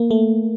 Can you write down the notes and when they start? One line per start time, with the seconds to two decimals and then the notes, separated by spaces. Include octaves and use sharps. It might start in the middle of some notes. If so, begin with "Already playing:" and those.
Already playing: A#3
0.11 A3